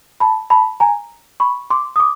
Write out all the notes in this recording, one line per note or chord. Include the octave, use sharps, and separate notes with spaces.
A5 B5
A5 B5
G#5 A#5
B5 C#6
C6 D6
D#6
D6